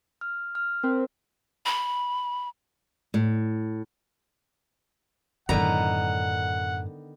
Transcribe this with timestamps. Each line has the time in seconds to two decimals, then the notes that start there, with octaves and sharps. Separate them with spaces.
0.21 F6
0.55 F6
0.83 C4 A#4
1.66 B5
3.14 A2
5.49 F#2 A2 D3 D#3 B3 F#5 A#5